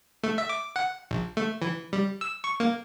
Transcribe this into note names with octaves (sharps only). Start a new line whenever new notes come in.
A3
E5
D6
F#5
A#1
A3
E3
G3
E6
C#6
A#3